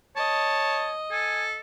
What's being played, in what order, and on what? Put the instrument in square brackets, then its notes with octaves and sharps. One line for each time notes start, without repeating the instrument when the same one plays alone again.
[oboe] C#5 [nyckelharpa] D#5 [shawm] A5
[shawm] A4 [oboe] G#5